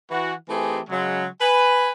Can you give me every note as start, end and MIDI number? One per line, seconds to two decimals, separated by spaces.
0.11 0.34 52
0.11 0.34 66
0.49 0.80 52
0.49 0.80 57
0.49 0.80 60
0.49 0.80 63
0.49 0.80 67
0.49 0.80 68
0.89 1.26 49
0.89 1.26 54
0.89 1.26 56
1.41 1.92 71
1.41 1.92 80